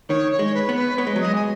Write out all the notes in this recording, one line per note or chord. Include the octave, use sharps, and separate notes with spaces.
D#3 C#5
C#5
G#3
B4
B3
B4
B3 C#5
G#3
F#3 C#5
G#3 D#5
G#5